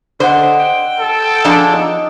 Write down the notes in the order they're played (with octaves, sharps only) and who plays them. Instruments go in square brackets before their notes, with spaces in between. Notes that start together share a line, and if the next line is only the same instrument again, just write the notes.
[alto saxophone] D3 [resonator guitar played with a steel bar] C5 [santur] D#5 F#5
[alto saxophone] G5
[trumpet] A4
[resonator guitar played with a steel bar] F3 D4 G#4
[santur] D#4 D#5